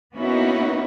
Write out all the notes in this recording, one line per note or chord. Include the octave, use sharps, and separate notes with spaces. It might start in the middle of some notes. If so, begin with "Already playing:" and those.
A#3 B3 C#4 D#4 E4 F#4